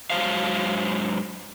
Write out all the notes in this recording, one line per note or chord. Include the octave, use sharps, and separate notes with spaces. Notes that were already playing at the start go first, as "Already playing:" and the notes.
G#2 E3 F#3 C5 F5